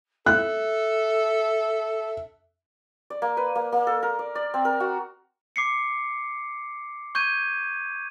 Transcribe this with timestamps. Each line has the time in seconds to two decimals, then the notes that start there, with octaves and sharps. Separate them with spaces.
0.26 A4 E5 F#6
3.10 D5
3.22 A#3
3.37 B4
3.55 A#3
3.72 A#3
3.87 A4
4.03 A#4
4.19 D5
4.35 D5
4.54 C4
4.65 A#4
4.80 F#4
5.56 D6 C7 C#7
7.15 C#6 G6 G#6 D#7